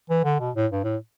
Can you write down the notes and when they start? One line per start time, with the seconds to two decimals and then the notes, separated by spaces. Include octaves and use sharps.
0.10 E3
0.24 D3
0.40 B2
0.56 A2
0.72 G2
0.84 A2